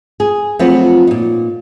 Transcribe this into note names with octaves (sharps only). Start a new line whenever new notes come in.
G#4
F3 F#3 A3 B3 C4 F4
A#2 D#4